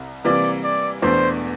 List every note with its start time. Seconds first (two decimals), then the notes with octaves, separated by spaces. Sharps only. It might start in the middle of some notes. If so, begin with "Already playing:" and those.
Already playing: C2 C3
0.25 C3 E3 G3 A#3 D5
0.64 D5
1.02 E1 E2 E3 A3 D4 C5